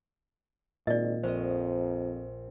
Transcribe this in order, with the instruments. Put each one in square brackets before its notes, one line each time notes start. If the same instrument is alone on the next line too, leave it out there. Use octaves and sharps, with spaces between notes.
[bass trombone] G#1 [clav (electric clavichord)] A#2 [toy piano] D5 D#5
[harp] A#1 D#5 [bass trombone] F2 [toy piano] C5